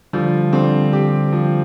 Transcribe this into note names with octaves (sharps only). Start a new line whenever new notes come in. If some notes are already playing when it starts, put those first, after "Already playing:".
D3 F3 G3
D3 G3 C4
G4
F3